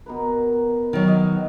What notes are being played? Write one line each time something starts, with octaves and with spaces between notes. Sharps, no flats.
B2 A#4 B4
D#3 F#3
D#5 F5 F#5